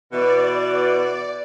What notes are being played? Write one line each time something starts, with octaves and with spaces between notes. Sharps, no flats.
B2 E3 D5